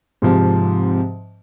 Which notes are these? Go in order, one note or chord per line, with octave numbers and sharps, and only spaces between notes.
G#2 C3 F3